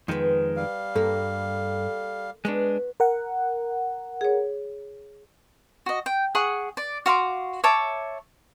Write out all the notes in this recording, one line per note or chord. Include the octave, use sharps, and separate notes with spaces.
F2 D#3 G#3 B3 C5
G3 F5
G2 A#3 A4
G#3 B3 D4 F#4
A#4 F#5
G#4 C#5
F#4 D#5
G5
G#4 F#5 C#6
D5
F#4 F5 C6 D6
C#5 E5 A5 D6